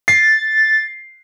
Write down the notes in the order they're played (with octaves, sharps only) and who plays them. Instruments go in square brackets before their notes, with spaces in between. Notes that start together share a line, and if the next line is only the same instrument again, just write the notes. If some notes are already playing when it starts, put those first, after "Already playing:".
[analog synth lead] A6 [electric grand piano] C7